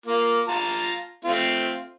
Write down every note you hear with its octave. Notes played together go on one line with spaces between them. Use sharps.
A#3 F4
F4 A5 A#5
A3 C4 F4